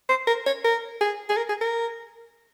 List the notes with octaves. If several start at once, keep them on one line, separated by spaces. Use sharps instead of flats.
C5
A#4
C#5
A#4
G#4
G#4
A#4
G#4
A#4